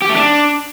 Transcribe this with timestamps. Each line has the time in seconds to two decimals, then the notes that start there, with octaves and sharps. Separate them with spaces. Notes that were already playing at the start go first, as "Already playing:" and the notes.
0.02 G4
0.09 A3
0.16 D4